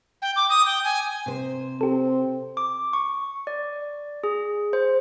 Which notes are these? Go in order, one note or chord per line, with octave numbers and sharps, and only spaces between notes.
G5
D6
D#6
G5
G#5
C3 C5
C4 G4 A4
D6
C#6
D5
G#4
C5